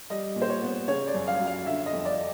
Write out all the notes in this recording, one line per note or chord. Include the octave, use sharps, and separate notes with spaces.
G3 D#5
A#2
C5
C#5
B3
C#3 C#5
D5
F#2
F5
F#3
F5
D3 E5
D#5
F2
D5